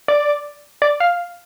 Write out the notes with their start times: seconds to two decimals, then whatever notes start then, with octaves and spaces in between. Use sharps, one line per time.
0.08 D5
0.82 D5
1.00 F5